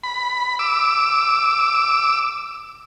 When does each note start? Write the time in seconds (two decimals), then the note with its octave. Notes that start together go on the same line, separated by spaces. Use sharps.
0.04 B5
0.59 D6 E6